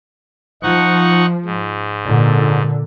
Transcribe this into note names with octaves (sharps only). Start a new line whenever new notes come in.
F3 D#4 F#5 C#6
G#2
A#2 D3